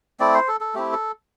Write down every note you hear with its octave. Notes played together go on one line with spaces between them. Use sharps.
A3 C4 E4 D5
C5
A4
A4
A3 C4 E4 G4
A4